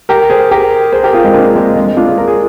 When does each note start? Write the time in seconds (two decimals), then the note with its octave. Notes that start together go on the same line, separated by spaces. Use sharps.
0.09 G4 A#4
0.30 G#4 C5
0.51 G4 A#4
0.92 G#4 C5
1.04 G4 A#4
1.13 F4 G#4
1.24 G#3 C4
1.34 A#3 D4
1.56 G#3 C4
1.76 G#3
1.87 G#3
1.97 D4 F4
2.07 F4 G#4
2.18 A#4
2.28 G#4